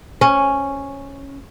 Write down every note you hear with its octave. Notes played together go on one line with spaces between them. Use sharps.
C#4